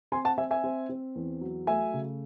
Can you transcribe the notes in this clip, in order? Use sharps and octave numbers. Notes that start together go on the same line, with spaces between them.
C4 G#5 C6
F#5 A5
C4 E5 G#5
E5 G#5
C4
C4
E2
F#3
A3 E5 G#5
C#3